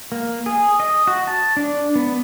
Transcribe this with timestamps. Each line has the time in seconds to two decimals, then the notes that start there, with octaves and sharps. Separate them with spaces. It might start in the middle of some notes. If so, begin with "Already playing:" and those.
0.12 A#3
0.46 G#4
0.80 D#5
1.07 F#4
1.27 A5
1.57 D4
1.96 B3